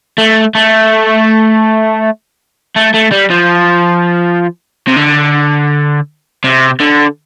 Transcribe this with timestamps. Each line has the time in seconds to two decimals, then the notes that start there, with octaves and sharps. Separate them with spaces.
0.18 A3
0.55 A3
2.76 A3
2.94 A3
3.12 G3
3.30 F3
4.87 C3
4.96 D3
6.44 C3
6.80 D3